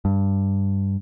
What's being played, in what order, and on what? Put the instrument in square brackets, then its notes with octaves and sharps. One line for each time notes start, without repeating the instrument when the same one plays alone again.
[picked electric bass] G2